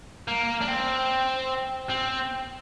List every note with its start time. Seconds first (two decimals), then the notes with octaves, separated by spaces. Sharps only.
0.28 A#3
0.61 D4
0.68 C4
1.90 C4